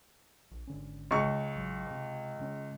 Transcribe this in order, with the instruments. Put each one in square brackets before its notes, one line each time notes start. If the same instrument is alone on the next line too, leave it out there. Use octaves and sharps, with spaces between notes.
[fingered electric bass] A#1
G#1 D3 C#4
[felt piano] C#2 C#6
[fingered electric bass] A1 F#3
C3
C#3 G#3 C#4